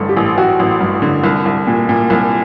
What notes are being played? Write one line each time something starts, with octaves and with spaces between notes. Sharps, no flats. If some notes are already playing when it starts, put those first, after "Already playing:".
Already playing: A1 G2 D3 A4
G4
A1
A1 F#4
A1
G2
D3
C2
C2
A#2
A#2
C2